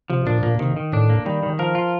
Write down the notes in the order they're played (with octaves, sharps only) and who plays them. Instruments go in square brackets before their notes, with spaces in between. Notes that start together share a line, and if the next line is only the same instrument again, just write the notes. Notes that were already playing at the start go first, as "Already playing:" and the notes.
[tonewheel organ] C3 [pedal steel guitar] F3
[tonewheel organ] A#2 [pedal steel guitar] D4
[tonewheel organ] A#2 [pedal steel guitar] A#3
[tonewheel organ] C3 [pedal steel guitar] D#3
[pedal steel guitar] D#3
[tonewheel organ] A2 [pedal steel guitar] D4
[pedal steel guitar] A#3
[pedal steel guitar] D#3 [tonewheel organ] G3
[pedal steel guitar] D#3
[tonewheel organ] F3 [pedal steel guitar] A#4
[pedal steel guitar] F4